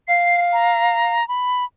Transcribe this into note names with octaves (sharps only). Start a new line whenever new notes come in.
F5 C7
A#5
B5